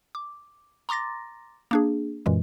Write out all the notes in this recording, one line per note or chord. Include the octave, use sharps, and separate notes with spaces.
D6
A#5 C6 D6 A6 A#6
A#3 D4 G#4
F#2 A#2 E3 G#3